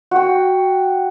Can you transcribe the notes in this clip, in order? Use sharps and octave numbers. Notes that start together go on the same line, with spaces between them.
F#4 G5